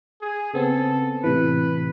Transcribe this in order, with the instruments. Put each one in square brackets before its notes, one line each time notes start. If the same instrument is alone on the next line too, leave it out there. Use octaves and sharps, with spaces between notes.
[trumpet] G#4
[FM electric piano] C#3 B3 C4 [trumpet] A4
[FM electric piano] A2 C3 E3 [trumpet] B4